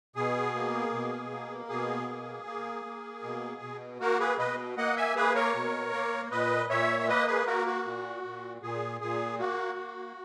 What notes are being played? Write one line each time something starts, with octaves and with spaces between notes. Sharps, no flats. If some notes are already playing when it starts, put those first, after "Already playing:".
B2 G#4
A#3
B2
A#3
B2 G#4
A#3
A#3
A#3
B2
B2
A#3 F#4 A#4
G#4 B4
B2 B4 D#5
A#3 D#5 F#5
E5 G#5
A#3 G#4 B4
A#4 C#5
B2
A#3
A#2 B4 D#5
A#2 C#5 E5
E5
A#3 B4 D#5
G#4 B4
A#3 F#4 A#4
F#4
A#2
A#2
A#2 G#4
A#2 G#4
A#3 F#4
A#3